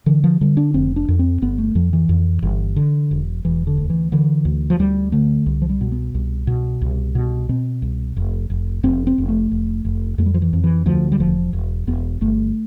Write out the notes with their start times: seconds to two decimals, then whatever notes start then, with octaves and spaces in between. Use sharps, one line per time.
0.06 D3 E3
0.24 F3
0.41 D3 G3
0.57 D4
0.74 F1 C4
0.96 D4
1.08 F2
1.19 C4
1.42 G1 B3
1.58 A3
1.75 F2 F3
1.93 E3
2.09 F2
2.42 G1
2.76 D3
3.11 E1
3.45 E1 E3
3.67 D3
3.78 D2
3.90 E3
4.12 D3 E3
4.45 D2
4.70 F3
4.79 D2 G3
5.12 D3 A3
5.46 C2
5.62 F3
5.69 G3
5.81 B2
5.92 B3
6.15 C2
6.47 B2
6.82 C2
7.15 B2
7.49 B2 C4
7.82 C2
8.16 F1
8.50 F1
8.83 F1 C4
9.07 C4
9.18 F1
9.29 A3
9.51 F1
9.85 F1
10.18 F2 A3
10.26 G3
10.34 F3
10.42 E3
10.53 F2
10.64 E3
10.86 D2 F3
11.12 G3
11.20 E1 F3
11.53 E1
11.87 E1 B3
12.21 G1 A3